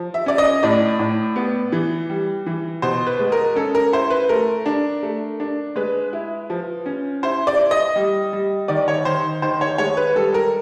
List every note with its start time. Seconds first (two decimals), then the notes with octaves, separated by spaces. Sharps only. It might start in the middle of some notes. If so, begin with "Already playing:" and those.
Already playing: F3
0.14 E5
0.26 C#4 D5
0.38 D#5
0.63 A2 D5
0.99 A2
1.36 B3
1.72 E3
2.10 G3
2.46 E3
2.82 B2 C5
3.07 B4
3.19 G#3
3.32 A#4
3.56 C#4 A4
3.75 A#4
3.93 E4 C5
4.10 B4
4.29 A3 A#4
4.66 D4
5.03 A3
5.40 D4
5.76 G#3 B4
6.13 E4
6.50 F3
6.86 C#4
7.23 E4 C5
7.47 D5
7.59 E4
7.71 D#5
7.96 G3
8.33 G3
8.68 D#3 D5
8.88 C#5
9.05 D#3 C5
9.42 D#3 C5
9.61 C#5
9.78 G#3 C#5
9.97 B4
10.15 G3 A4
10.34 A#4